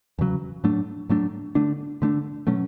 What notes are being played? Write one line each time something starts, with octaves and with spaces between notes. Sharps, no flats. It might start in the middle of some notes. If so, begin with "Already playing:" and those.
E2 C#3 F#3
A2 F#3 A3 D4
A2 F#3 A3 D4
D3 A3 D4
D3 A3 D4
B2 F#3 A3 C#4